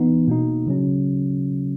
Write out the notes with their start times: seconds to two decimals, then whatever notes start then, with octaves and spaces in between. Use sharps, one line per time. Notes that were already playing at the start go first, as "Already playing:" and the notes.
Already playing: E3 B3 D#4
0.28 B2 A#3 D#4
0.66 C#3 F#3 C#4